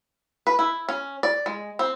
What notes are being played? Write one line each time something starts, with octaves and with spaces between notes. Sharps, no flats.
B4
E4
C#4
D5
G#3
C4